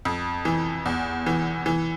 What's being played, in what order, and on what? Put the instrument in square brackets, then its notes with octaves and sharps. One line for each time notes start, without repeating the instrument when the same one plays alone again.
[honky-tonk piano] F2
E3
E2
E3
E3